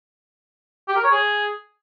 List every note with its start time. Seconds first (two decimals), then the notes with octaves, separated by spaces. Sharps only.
0.88 G4
0.96 A#4
1.04 C#5
1.11 G#4